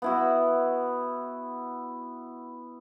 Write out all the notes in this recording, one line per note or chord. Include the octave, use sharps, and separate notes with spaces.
B3 E4 F#4